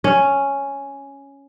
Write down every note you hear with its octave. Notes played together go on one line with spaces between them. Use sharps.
C#4